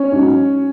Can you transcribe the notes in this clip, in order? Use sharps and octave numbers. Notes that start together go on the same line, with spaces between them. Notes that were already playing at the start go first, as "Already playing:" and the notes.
Already playing: C#4 C#5
G#2 F#3